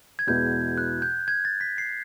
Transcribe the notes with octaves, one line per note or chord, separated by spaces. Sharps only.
G#6
E2 B2 G#3 B3 E4 G6
F#6
G6
G#6
A6
B6
C7